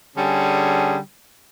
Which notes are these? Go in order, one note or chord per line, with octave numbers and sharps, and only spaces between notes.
D3 G3 C#4 G#4